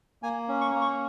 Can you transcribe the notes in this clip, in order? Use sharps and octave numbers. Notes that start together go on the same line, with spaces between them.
A#3 G#5
C#4
C#6
A#3
C#6